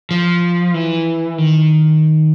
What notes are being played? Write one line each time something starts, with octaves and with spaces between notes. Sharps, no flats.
F3
E3
D#3